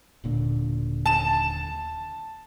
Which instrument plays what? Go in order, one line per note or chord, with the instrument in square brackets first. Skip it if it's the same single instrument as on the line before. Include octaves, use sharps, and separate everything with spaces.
[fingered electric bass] D#1 A#2 D3
[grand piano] A5 E7